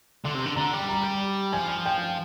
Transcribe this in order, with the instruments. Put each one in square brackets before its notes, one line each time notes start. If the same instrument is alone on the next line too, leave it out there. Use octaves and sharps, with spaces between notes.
[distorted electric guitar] D3 [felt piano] C6
[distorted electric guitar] C3
D3
[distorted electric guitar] D3 [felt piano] A#5
[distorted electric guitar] G3
[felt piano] A#5
[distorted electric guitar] F3 [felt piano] G#5
[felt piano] G5